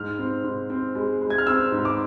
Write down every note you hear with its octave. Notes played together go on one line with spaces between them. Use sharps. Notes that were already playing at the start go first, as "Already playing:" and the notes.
Already playing: G#2 F6
C4
G#2
C4
G#3
G#3
G#6
F6
C4 E6
G#2
D6